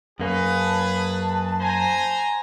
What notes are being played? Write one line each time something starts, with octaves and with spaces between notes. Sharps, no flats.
F#2 A#3 C#4 G#4 B4
A5
C5 G#5 A#5